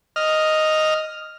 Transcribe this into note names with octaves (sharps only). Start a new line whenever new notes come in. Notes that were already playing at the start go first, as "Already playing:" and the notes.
D#5 F6